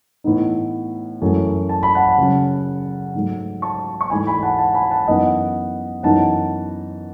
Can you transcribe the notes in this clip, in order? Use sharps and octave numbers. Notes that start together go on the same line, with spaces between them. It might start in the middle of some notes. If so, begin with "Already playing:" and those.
A2 E3 B3 D#4
F#2 E3 A3
A5
B5
F#5 A5
C#3 F#3 C#4
G#2 F#3 A3
A5 C#6
C#6
G#2 E3 A3 G#5 B5
G#5 B5
F#5 A5
F#5 A5
G#5 B5
F#5 A5
F#2 E3 B3 D#4 D#5 F#5
F#2 E3 B3 D#4 F#5 A5